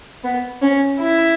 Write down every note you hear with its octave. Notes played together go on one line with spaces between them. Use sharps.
B3
C#4
E4